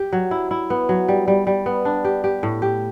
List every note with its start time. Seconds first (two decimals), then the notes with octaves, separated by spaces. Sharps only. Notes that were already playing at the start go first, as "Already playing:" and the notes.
Already playing: G4
0.13 F#3
0.31 E4
0.51 E4
0.70 B3
0.89 F#3
1.08 G3
1.28 G3
1.47 G3
1.66 B3
1.85 D4
2.05 G4
2.24 G4
2.43 A2
2.62 G4